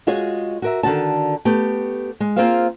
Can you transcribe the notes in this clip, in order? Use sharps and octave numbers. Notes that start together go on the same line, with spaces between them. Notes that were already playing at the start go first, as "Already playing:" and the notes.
G#3 F4 F#4 G#4 C#5
F#4 A#4 E5
D3 D#3 F#4 A5
A3 B3 G4
G#3
A#3 C4 F4 G#4 C5 F5